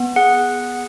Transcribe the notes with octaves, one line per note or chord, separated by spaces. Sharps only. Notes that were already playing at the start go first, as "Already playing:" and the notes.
Already playing: B3
G#4 F#5